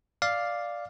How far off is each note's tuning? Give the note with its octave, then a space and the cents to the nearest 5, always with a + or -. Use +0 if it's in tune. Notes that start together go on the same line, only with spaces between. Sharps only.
D5 +0 F5 +0